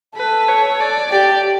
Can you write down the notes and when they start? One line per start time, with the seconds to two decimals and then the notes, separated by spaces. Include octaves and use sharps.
0.17 A4 B4
0.48 C#5
0.80 D5
1.11 G4 D5